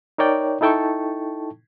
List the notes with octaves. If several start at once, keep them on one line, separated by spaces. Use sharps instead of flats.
D#4 A#4 C#5 D5 G5
D#4 E4 A4 G5 A5 C#6